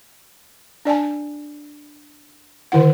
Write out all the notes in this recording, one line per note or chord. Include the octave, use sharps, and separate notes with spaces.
D4 D5 G#5 A5
D3 D#3 E4 F#5